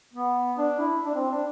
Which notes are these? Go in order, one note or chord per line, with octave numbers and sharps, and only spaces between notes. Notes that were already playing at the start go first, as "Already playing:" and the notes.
B3
D4
E4
D4
C4
D4